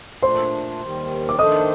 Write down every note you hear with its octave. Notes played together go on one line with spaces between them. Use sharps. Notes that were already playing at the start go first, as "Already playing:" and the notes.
A#2 A3 D4 C5 C6
D#2 D#3 G3
D6
D#3 A3 D4 A4 C5 D#5 D#6